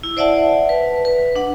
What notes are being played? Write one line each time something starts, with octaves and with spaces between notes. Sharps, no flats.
E4
C5 D5 E5 F#5 A5
B4
B4
D4 F#5